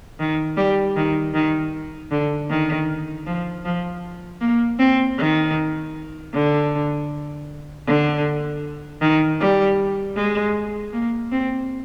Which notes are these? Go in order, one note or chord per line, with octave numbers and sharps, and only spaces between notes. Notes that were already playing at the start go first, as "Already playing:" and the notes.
D#3
G3
D#3
D#3
D3
D#3
F3
F3
A#3
C4
D#3
D3
D3
D#3
G3
G#3
A#3
C4